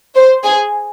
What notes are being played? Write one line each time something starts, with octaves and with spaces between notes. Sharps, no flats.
C5
G#4